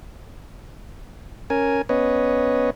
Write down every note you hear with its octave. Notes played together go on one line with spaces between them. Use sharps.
C#4 A#4 G#5
B3 C#4 B4 C#5 D#5